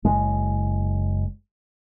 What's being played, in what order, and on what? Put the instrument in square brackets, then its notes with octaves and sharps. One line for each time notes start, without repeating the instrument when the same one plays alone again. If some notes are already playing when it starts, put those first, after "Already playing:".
[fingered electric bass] F#1 G#3